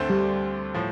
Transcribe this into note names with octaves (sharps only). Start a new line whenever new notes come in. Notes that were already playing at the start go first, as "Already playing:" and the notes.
Already playing: D2 D3 A3 C4
G3
A2 F3